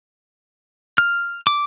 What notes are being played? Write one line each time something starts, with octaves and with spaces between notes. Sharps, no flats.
F6
D6